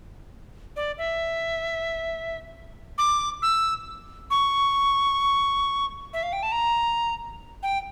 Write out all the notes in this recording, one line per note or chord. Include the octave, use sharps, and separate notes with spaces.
D5
E5
D6
E6
C#6
E5
F5
G5
A5
A#5
G5